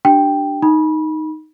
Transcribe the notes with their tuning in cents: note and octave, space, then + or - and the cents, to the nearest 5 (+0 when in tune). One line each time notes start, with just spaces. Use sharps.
D4 +0 G4 -25 G5 +0
D#4 +0 B5 -25